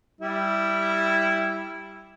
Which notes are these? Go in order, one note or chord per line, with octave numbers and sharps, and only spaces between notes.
G3 E4